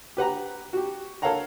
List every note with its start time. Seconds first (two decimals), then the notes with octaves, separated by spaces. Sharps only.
0.17 G4 B4 F#5 A#5
0.73 F#4 G4
1.22 A4 A#4 C#5 F5 F#5 A#5